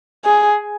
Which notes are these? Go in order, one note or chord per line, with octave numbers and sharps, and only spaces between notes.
G#4